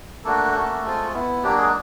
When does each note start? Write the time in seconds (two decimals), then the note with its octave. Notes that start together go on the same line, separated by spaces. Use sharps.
0.24 A3 A#3 D4 F#4 A4
0.54 A#3 C#4 F#4
0.84 G#3 C4 F4
1.13 B3 E4
1.43 F#3 A#3 D4 G4
1.58 G#3 G#4